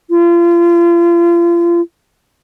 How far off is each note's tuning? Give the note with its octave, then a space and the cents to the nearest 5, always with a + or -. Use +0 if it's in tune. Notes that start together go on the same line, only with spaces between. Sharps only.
F4 -35